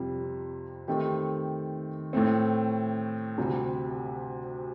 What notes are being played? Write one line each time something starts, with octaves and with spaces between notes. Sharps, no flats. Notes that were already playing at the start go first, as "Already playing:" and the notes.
Already playing: F2 C3 G3
D#3 A3 C4 G4
A2 A3 C4
D2 C3 G3